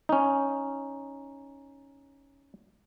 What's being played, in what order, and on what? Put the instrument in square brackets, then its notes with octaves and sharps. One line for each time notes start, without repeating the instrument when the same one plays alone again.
[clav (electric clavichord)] C#4 D#4